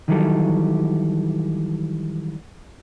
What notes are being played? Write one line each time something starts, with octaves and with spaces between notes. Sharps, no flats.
D#3 E3 F#3 G3 A4